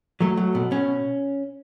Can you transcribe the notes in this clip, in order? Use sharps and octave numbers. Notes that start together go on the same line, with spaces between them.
F#3 A3
F#3
B2
B2 C#4